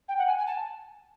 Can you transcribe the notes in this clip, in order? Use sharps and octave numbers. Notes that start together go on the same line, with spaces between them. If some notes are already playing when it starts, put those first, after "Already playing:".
G5
F#5
G#5
G#5
A5